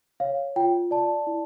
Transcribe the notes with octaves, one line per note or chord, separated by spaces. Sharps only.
C#5 F5
F4 G5
D5 A5
E4